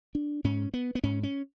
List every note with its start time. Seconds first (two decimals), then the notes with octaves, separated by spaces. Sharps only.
0.15 D4
0.44 G#2 C#4
0.74 B3
0.95 B3
1.03 G#2 C#4
1.23 C#4